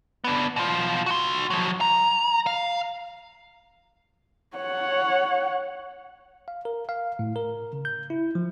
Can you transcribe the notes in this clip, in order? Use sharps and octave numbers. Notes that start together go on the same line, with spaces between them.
B3 D4
B2 F4
F#4 C6
F3 F#3
A#5
F5
C#5 F#5
F5
A#4
F5
A2
A#4
C#3
G6
E4
F3